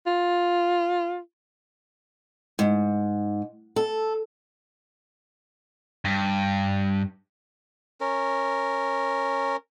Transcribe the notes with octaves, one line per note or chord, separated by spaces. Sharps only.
F4
G#2
A4
G2
C#4 A#4